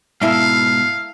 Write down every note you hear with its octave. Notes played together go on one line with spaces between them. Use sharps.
G#2 B2 A#3 E4 A4 F5